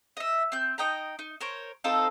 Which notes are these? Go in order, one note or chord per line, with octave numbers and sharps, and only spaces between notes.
D#5 E5
C4 G6
D#4 D#5 G5 A#5
D#4
A#4 C5 C#5
C4 D#4 F4 A4